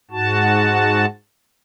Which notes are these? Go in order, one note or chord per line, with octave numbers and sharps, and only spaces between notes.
G#2 F#4 A5